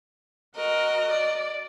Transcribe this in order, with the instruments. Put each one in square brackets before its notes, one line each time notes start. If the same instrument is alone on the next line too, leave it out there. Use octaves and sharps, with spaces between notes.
[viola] F#4 A#4 [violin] D#5
[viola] D5